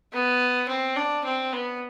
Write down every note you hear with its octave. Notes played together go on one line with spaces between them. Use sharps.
B3
C4
D4
C4
B3